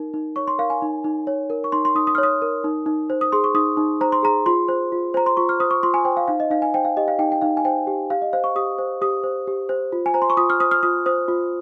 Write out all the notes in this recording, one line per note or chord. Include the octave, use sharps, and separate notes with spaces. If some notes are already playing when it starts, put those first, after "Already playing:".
Already playing: D#4 A#4
D#4
C#5 C#6
C6
A#4 F5
G#5
D#4
D#4
C#5
A#4
C#6
D#4 C6
C6
D#4 D#6
D#6
F6
C#5
D#6
A#4
D#4
D#4
C5
D#6
G#4 C6
C#6
D#4 D#6
D#4
C5 A#5
C6
G#4 A#5
F4 C6
C5
F4
C5 A#5
C6
F4 C#6
F6
C5 D#6
C#6
F4 C6
G#5
C5 G5
F5
D#4 F5
D#5
D#4 F5
G#5
C5 G5
F5
G4 D#5
F5
D#4 G5
G5
D#4 F5
G#5
C5 G5
G4
G4 F5
D#5
C5 F5
C#6
G4 D#6
C5
G4 D#6
C5
G4
C5
F4
G#5
C5 A#5
C6
C#6
F4 D#6
F6
C5 D#6
F6
F4 D#6
C5 D#6
F4